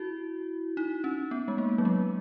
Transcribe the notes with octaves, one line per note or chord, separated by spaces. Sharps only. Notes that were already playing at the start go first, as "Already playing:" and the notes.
Already playing: E4 F#4
D#4
C#4
B3
G#3
A#3
F#3
G#3